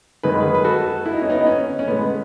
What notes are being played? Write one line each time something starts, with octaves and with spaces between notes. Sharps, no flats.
F#2 D#3 G#3 B4
G#4 B4
B4
F#4 A4
E4
D#4
C#4
B3 D#4
C#4
C#4
A2 G#3 B3